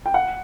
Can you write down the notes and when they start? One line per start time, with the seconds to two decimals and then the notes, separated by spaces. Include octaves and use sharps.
0.06 G5
0.14 F#5